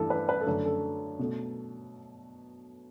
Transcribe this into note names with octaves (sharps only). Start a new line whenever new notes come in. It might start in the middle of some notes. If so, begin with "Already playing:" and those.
Already playing: G2 E3 A3 A4
B4
B4
A4
F#2 D3 A3
A4
B2 A3